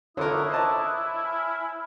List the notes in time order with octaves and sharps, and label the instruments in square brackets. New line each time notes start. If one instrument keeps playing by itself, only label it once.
[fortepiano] D3 F4 A#4 [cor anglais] E4 [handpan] C#5 [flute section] D6 D#6 F#6
[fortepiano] C5 D#5 A5
[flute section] G#5 F6